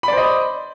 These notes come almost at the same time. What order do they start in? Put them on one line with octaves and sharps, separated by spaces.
B5 D5 C5 D#5